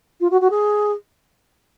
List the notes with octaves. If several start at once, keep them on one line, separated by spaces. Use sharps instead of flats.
F4
F#4
F#4
G#4